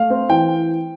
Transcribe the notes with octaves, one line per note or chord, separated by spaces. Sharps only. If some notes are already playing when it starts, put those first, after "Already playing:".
Already playing: A3 F5
C4
E3 G5